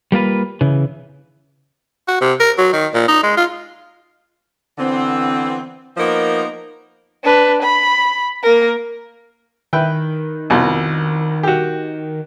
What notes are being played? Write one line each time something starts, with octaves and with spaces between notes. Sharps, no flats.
G3 A#3 F4 B4
C#3 E3
F#4
C3
A#4
F#3
D#3
A#2
D#4
G#3
F4
D3 E3 B3 C4
F3 A#3 B3 D#4 A#4 C5
D4 B4
B5
A#3 A#4
D#3 E4 B4 G5
C2 F2 B2
F#4 G4